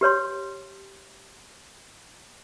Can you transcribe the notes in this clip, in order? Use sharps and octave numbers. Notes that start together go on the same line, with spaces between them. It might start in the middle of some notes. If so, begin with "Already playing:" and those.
G4 B4 C#5 C6